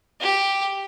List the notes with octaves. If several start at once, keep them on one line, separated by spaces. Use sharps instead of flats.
G4